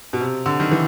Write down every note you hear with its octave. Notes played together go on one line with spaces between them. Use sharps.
B2
C3
D3
D#3
E3